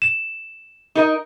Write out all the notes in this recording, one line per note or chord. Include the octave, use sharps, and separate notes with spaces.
E7
D#4 A#4 D#5